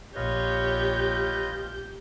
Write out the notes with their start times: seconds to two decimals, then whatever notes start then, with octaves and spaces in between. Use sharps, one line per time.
0.16 A#1 F4 G4 B4 C#5 D#5 G6